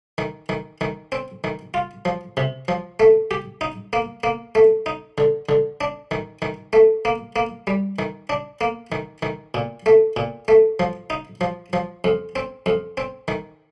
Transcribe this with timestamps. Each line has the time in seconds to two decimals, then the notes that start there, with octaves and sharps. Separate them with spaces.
0.18 D#3
0.49 D#3
0.81 D#3
1.12 C4
1.44 D#3
1.74 F4
2.05 F3
2.37 C3
2.68 F3
3.00 A3
3.31 G4
3.61 D#4
3.93 A#3
4.24 A#3
4.55 A3
4.86 D#4
5.18 D3
5.49 D3
5.81 D4
6.11 D#3
6.42 D#3
6.73 A3
7.05 A#3
7.36 A#3
7.67 G3
7.99 D#3
8.30 D4
8.61 A#3
8.92 D#3
9.23 D#3
9.54 A#2
9.86 A3
10.16 A#2
10.48 A3
10.80 F3
11.10 D#4
11.41 F3
11.73 F3
12.04 F2
12.36 C4
12.66 F2
12.97 C4
13.28 D#3